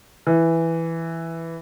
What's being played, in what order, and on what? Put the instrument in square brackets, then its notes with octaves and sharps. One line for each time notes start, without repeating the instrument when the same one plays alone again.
[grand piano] E3